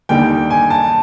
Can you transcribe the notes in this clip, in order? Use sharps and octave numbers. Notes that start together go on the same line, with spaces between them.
D#2 D3 G3 A#3 D#4 G5
G#5
A5